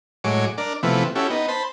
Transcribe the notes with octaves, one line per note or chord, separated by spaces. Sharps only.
A2 F#3 G#3 C#5 D6
D4 A#4 D5
C3 E3 F3 A3 B3
C#4 E4 F#4 G4 A4
B3 D#4
C5 A5 B5